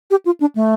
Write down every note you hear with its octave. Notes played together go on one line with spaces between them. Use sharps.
G4
F4
D4
A3